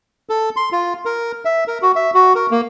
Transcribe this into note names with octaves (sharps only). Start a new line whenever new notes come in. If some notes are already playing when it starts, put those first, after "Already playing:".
A4
C6
F4
A#4
E5
A#4
F#4
E5
F#4
A#4
A#3